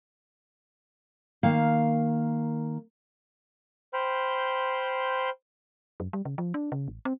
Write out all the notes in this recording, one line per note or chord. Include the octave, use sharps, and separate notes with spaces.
D#3 A#3 F5
C5 G5 B5 C6 F6 G6
F#2
G3
C#3
F3
D4
C#3
A1
C4